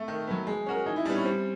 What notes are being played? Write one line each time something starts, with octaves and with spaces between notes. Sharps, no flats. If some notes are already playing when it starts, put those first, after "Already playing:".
Already playing: A3
D#3
F#3 B3
G#3
C#4 F#4 A#4
E3 D#4
E4
G3 B3 D4
C#4
G3 C4